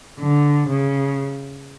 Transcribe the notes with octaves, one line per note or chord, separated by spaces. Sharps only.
D3
C#3